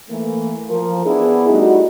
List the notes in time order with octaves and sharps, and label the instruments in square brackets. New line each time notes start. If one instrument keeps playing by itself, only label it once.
[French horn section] E3 A3 A#3
F3 A#4
B3 D4 E4 G#4
G3 A3 D#4 E4 F#4